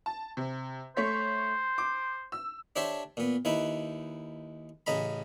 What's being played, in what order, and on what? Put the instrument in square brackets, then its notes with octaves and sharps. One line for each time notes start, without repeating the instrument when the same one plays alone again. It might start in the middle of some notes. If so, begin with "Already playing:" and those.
[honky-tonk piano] A5
C3
[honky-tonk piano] A3 C#5 B6 [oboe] C5
[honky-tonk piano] D6
E6
[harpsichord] D4 G4 A4 C5 C#5 E5
A#2 B3
D#2 D#4 E4 B4
A1 C#3 D#5 A#5 B5